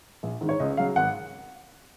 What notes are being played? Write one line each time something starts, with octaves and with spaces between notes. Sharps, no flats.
A#1
G#2 D#3
C#5
C#2 D#5
C#3 F#3 F5
G#1 F#5